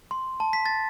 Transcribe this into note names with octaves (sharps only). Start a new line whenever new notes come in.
C6
A5
B6
A6